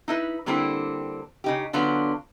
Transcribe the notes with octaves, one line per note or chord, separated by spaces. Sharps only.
D#4 E4 B4
D3 G3 A#3 C4 D4 E4
C#3 D#4 G4
D3 F#3 B3 D4 F4